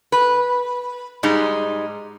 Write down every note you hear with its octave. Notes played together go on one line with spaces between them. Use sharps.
B4
G#2 G3 G#3 D#4